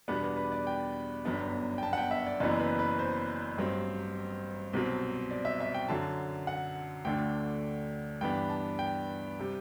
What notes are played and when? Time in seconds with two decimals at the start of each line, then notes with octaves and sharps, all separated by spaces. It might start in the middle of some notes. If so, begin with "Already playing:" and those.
0.08 E2 B2 G3 B3 D4 B4
0.23 B4
0.37 B4
0.52 D5
0.67 G5
1.25 G1 F#2 F#3 B3 D4
1.78 G5
1.83 A5
1.93 F#5
1.98 G5
2.11 E5
2.27 D5
2.40 F#1 F#2 E3 B3 E4 D5
2.60 B4
2.79 B4
2.99 C5
3.57 A1 G2 F#3 C4
4.73 C2 B2 F#3 C4
5.31 D5
5.45 E5
5.60 E5
5.74 G5
5.89 F#2 D3 F#3 A5
6.47 F#5
7.05 D2 D3 A3 D4 G5
8.21 G2 E3 B3 D4 G5
8.50 A5
8.79 G5
9.39 C3 G3